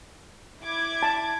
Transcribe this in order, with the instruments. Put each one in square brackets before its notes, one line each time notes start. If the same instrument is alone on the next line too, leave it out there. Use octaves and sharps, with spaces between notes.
[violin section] E4 D6 G#6
[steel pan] A5